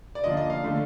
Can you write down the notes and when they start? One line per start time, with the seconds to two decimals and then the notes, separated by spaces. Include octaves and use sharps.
0.15 D5
0.24 D3 F3 A#3 D4 D#5
0.37 D#5
0.50 F5
0.63 D3 A3 D4